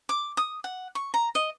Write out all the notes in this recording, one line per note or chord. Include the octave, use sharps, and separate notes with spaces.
D6
D#6
F#5
C#6
A#5
D#5